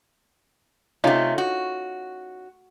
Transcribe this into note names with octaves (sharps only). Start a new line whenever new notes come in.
C3 A3 C#4 D#4 F4
F#4